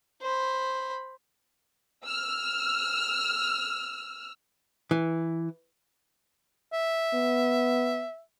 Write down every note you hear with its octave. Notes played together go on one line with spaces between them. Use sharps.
C5 B5
E6 F6
E3
E5
B3